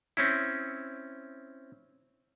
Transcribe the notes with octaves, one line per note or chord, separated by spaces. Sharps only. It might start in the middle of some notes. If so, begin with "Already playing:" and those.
C4 C#4 E4